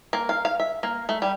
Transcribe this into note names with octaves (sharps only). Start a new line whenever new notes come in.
A#3
F5
F5
E5
A#3
A3
G3